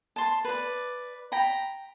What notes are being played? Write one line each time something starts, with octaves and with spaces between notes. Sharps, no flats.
A5 C6
B4 D5
G5 A#5 B5